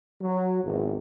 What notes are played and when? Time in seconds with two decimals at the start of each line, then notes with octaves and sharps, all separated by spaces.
0.21 F#3
0.64 G#1 E2